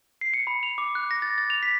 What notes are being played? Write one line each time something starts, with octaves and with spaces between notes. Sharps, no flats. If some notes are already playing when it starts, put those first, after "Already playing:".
C7
C#7
B5
F7
D6
F#6
A#6
A6
A6
F7
B6